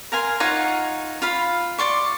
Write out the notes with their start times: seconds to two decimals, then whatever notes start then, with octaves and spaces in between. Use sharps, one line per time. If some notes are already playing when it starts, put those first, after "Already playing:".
0.12 A#4 F5 G#5 C6
0.40 D#4 F4 C#5 F#5
1.22 F4 F5 B5
1.78 D5 C6 C#6